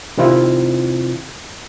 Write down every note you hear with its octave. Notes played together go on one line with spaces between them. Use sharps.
C3 D#3 C4 E4 F4